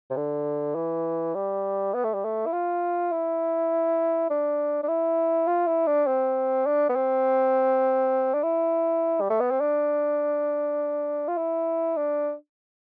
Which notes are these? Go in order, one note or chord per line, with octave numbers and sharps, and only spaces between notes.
C3
D3
E3
G3
B3
A3
G3
A3
E4
F4
E4
D4
D4
E4
F4
E4
D4
C4
D4
B3
C4
D4
E4
G3
A3
B3
C4
D4
F4
E4
D4